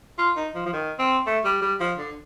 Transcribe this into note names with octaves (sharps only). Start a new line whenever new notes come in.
F4
D#4
F3
F3
D#3
C4
A3
G3
G3
F3
D3